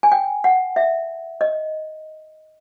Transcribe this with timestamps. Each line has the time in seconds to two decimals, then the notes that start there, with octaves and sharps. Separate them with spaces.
0.03 G#5
0.12 G5
0.44 F#5
0.76 E5
1.41 D#5